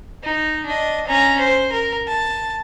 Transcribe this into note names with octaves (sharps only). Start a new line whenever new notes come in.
D#4
D4 D#5
C#4 A#5
C5
A#4
A5